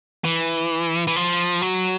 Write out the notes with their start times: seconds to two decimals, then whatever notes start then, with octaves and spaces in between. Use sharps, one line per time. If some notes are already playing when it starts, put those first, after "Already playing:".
0.25 E3
1.07 E3
1.16 F3
1.62 F#3